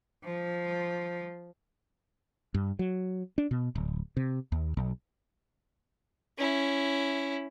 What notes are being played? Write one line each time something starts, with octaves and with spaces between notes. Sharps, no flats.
F3
G2
F#3
D4
B2
D1
C3
D#2
B1
C#4 E4